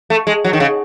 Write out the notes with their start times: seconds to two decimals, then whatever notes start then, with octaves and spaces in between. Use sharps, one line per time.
0.10 A3
0.27 G#3
0.44 F#3
0.53 D#3
0.60 C#3